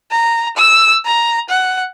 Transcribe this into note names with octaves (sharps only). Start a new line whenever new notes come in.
A#5
E6
A#5
F#5